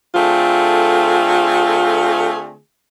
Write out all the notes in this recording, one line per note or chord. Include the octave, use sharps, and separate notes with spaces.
D3 A3 C4 F4 G#4